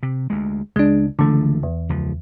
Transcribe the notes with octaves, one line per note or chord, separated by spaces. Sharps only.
C3
D2 G#3
C#2 G#3 D4
C#2 D3 E3 F3 A3
E2
C#2 F3